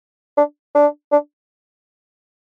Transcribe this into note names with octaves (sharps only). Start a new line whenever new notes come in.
D4
D4
D4